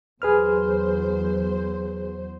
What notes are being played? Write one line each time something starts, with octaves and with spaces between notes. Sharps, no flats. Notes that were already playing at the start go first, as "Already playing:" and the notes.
E2 F#3 G#4 B4 C5 F6